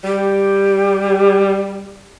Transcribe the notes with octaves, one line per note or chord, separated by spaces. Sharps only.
G3 G4